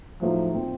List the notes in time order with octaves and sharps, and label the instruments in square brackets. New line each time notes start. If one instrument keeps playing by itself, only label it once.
[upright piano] A2 F#3 A3 D#4 [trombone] F3
[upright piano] A#2 F3 C4 F4